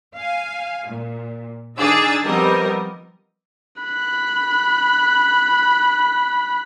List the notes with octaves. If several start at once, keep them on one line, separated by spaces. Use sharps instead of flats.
F5 G#5
A#2
D#3 D4 D#4 G#4 E6 A6
F3 G3 B3 C4 A#4 D#5
B5 F#6